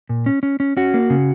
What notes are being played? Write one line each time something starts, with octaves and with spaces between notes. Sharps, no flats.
A#2
C#4
C#4
C#4
C#4 F#4
A#3
C#3